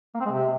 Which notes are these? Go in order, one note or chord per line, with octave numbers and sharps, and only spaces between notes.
A#3
C4
G#3
C3